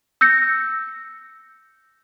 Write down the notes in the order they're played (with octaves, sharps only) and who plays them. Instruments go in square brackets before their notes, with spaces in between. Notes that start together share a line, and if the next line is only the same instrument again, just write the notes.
[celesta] E6 G6 A#6 C#7